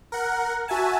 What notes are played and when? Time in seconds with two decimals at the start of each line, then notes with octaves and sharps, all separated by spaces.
0.12 A#4 F#5
0.68 F#4 E5 G#5 A5